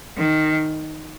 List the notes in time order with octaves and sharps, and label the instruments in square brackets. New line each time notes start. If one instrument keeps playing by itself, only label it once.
[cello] D#3